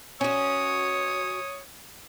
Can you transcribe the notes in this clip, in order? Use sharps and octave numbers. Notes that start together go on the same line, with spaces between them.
C#4 F#4 C#5 D#6